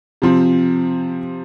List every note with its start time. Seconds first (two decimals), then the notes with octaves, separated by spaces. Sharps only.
0.22 C3 F3 C4